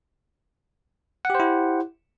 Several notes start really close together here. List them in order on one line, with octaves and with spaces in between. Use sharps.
F#5 G4 C5 E4